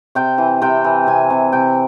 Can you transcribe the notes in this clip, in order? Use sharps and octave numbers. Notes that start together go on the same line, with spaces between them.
C3 G5
E3
C3 G5
E3
C3 G#5
C3
C3 G5